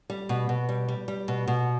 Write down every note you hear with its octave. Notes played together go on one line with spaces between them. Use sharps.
G3
B2
B2
G3
G3
G3
B2
B2